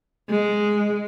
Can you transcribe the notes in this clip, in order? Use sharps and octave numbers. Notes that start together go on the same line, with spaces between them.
G#3